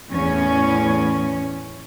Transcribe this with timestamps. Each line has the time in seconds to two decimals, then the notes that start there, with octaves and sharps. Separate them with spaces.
0.10 E2 A2 C#4